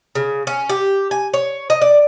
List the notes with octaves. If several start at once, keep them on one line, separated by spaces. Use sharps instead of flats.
C#3
C#4
G4
G#5
C#5
D#5
D5